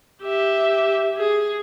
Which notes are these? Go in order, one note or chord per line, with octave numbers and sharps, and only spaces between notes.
G4 E5
G#4